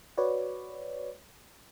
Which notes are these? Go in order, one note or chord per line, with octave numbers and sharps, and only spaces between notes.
F#4 B4 C#5 D5